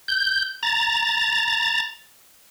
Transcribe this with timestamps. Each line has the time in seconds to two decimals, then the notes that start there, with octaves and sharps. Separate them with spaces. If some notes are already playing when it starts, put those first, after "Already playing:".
0.08 G6
0.63 A#5 A6